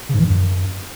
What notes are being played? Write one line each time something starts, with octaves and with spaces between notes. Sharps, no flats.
C#3
G#2
E3
G2
F#2